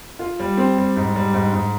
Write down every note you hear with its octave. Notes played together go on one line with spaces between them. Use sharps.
F4
G3
C4
G3
G#2
G3
G#2
G#2